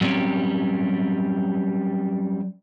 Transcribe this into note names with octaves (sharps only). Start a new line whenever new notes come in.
F#3 G3 C4 C#4 G4